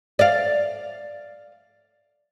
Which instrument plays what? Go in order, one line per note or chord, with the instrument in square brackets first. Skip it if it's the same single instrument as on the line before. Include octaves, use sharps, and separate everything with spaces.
[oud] D5 F5